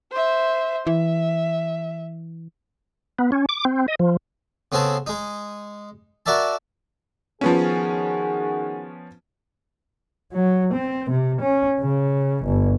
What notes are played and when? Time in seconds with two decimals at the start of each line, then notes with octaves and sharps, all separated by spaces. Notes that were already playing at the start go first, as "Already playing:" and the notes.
0.12 C5 E5
0.87 E3 E5
3.19 B3
3.32 C#4
3.49 D6
3.65 C4
3.88 D#5
4.00 F3
4.72 C#3 B3 C4 G#4 A4
5.07 G#3 D#4
6.26 F#4 A#4 D5 E5 A5
7.41 D#3 F3 B3 C#4 F#4 G#4
10.33 F#3
10.73 C4
11.10 C3
11.41 C#4
11.80 C#3
12.44 G1